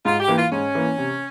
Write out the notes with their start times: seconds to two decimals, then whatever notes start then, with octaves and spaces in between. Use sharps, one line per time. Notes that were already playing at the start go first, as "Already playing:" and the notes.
0.05 G#2 F4
0.20 G4
0.28 E3 A#3
0.36 F4
0.51 G#2 C#4
0.75 E3 A#3
0.98 C3